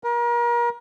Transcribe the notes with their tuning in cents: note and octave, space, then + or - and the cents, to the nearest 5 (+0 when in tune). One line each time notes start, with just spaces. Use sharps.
A#4 +35